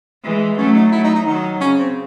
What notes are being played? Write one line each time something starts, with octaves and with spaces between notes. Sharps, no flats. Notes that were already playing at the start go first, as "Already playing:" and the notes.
E3 G#3
F#3 A3 C#4
D#4
F#3 A3 E4
D#4
D#4
D#3 F#3 D#4
C#3 C#4
C4